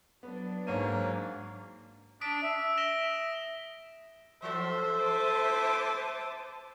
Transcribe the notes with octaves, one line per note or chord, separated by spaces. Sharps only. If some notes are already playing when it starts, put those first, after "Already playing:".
F#3 B3 D4
G#2 A#3 C#5 D#7
D4 D#6 B6 D7
E5
A#6 E7 G7
E3 F#4 A4 C5 E5
A5 D6 D#6